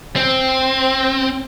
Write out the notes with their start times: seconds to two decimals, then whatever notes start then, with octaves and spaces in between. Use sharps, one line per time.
0.16 C4